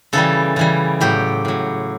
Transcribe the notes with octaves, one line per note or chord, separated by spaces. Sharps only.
C#3 E3 G3 A4
C#3 E3 G3
A2 F#3 G4
A2 F#3